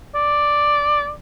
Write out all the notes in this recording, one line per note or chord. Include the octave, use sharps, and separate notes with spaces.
D5